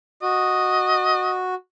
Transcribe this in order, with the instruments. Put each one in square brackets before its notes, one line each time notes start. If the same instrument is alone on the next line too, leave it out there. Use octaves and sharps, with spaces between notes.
[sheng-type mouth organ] F#4 [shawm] D#5